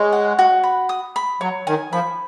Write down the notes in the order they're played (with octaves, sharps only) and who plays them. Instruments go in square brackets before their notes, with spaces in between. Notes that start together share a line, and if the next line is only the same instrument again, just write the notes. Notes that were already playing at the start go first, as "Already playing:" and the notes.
Already playing: [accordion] G#3 [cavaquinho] C#5
[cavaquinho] F#5
F#4
B5
D#6
B5
[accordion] F#3 [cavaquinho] C#5
[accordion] D#3 [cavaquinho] G#5
[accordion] F3 [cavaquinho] B5